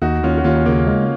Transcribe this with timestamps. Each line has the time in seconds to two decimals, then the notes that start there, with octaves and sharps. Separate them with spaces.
0.02 D#2 D#4 F#4
0.23 D#2 C#4 F4
0.38 F#4
0.44 D#2 C#4 F4
0.66 C#3 A#3 C#4
0.87 G#3